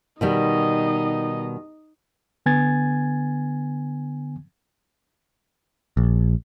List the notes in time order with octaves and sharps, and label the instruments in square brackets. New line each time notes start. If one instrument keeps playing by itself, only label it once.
[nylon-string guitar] B2 D#3 G3 [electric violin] D#4 D#5
[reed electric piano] D3 B3 G#5 G#6 A6
[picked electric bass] A#1